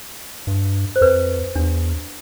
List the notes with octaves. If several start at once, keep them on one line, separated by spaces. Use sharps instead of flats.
G2
C5
F2 B4
E2 D4